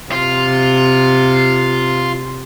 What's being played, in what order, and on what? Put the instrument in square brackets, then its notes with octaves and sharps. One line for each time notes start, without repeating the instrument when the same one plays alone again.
[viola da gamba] C3 [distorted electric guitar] F4